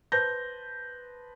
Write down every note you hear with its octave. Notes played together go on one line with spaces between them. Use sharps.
B4 C5 A5 G6 A#6